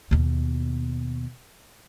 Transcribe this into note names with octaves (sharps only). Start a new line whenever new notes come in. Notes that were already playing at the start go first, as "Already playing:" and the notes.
D#2 B2